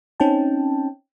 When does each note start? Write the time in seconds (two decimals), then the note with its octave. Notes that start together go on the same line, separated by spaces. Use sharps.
0.20 C4 C#4 D#4 G5 A5